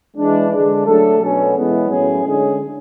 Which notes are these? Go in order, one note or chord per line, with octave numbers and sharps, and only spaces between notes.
E3 G#3 D4
D3 G#3 D4
F#3 A3 D4 A4
B2 F#3 C#4
E3 G#3 B3 E4
A2 F#3 C#4 G#4
D3 G#3 C#4 G#4